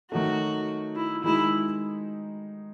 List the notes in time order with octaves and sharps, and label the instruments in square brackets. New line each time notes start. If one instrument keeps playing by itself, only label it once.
[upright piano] D#3 F#3 A3 [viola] F#4
[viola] E4
[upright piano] D#3 G#3 D#4 F#4 [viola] E4